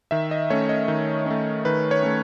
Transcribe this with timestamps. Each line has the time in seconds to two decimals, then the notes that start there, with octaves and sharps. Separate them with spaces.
0.11 D#3 E5
0.31 D#5
0.50 A3 C#4 C#5
0.69 D#5
0.88 D#3
1.26 A3 C#4
1.65 D#3 B4
1.91 C#5
2.03 A3 C#4